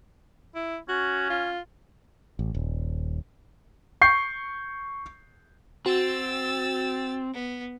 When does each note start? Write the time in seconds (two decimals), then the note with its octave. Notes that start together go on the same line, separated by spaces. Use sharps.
0.55 E4
0.89 C#4 F#4
1.30 F4
2.39 A1
2.54 D#1
4.01 C#6 G6 C7
5.86 C4 F#4 E6 A6
7.33 B3